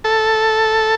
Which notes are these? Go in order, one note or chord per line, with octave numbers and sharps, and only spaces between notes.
A4